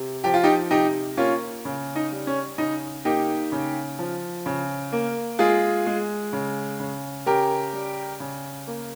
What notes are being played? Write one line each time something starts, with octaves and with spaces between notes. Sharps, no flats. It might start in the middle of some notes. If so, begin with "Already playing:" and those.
Already playing: C3
F3 G4
F4
D#4 G4
C3 D#4 G4
A#3 C#4 F4
C#3
D#4
G3
C#4
C#3 D#4
A#3 D#4 G4
C#3
F3
C#3
A#3
G#3 F4 G#4
G#3
C#3
C#3
C#3 G4 A#4
G3
C#3
A#3